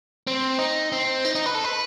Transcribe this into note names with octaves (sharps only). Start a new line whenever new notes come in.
C4
D#4
C4
D#4
D#4
B4
A4
B4